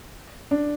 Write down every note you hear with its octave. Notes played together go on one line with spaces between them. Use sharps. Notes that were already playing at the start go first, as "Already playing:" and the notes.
D4